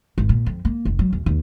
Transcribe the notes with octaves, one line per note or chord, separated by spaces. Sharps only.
G#1
A#2
F2
A#3
F1
F#3
E2
D#2